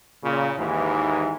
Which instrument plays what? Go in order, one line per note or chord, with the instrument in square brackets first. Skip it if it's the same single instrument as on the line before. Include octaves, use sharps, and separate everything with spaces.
[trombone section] A#2 C#3
D#2 G#2 E3